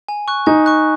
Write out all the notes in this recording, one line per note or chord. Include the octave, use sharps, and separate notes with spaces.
G#5
C#6 F#6
D#4 G#5
C#6 F#6